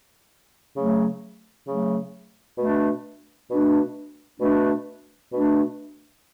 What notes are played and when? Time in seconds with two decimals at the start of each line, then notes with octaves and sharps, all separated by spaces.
0.74 C#3 F#3 A3
1.66 C#3 F#3 A3
2.57 B2 A3 D4
3.49 B2 A3 D4
4.39 B2 A3 D4
5.31 B2 A3 D4